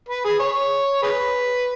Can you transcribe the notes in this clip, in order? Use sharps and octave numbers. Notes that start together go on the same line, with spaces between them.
B4
G#4
C#5
G#4 B4